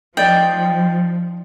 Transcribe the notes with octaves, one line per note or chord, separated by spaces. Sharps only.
F3 D#4 D5 D#5 G5